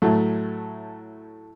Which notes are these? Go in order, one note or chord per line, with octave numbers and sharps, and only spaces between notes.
A2 F#3 A3